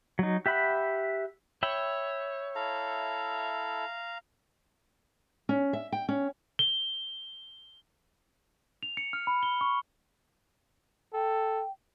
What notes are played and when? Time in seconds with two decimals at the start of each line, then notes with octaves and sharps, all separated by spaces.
0.19 F#3 D#4
0.46 G4 E5 F#5 B5
1.63 C#5 E5 G5 B5
2.55 E4 A4 F5 A#5
5.49 C#4
5.73 E5
5.92 G5
6.09 C#4
6.59 G7
8.83 F7
8.97 C#7
9.13 F6
9.27 B5
9.43 G7
9.61 C#6
11.14 A4 G5